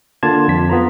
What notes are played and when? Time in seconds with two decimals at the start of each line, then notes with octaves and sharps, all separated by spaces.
0.23 D3 A#3 F4 A5 G#6
0.48 F2 B6
0.69 B3 F4 A#5